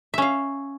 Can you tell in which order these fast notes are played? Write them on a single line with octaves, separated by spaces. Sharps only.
E5 C#4 F5